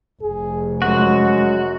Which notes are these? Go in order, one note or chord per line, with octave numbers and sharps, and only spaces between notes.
F1 G#4
F#2 G#3 F#4